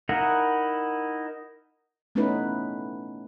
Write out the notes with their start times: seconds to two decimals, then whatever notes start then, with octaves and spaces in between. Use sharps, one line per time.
0.09 D#4 E4 A#4 F#5
2.15 A3 B3 C#4 D#4 E4 B4